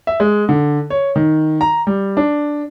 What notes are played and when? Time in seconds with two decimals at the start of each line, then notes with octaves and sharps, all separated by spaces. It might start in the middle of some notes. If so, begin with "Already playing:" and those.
0.07 E5
0.20 G#3
0.49 D3
0.90 C#5
1.16 D#3
1.61 A#5
1.87 G3
2.17 D4